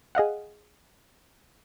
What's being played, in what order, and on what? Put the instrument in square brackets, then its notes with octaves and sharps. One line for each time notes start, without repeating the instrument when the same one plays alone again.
[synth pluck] G#4 D#5 F5 F#5